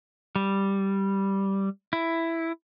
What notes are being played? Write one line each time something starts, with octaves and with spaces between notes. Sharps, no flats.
G3
E4